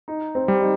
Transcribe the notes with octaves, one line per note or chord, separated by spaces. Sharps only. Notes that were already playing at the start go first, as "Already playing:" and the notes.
D#4
C4
G3
D#4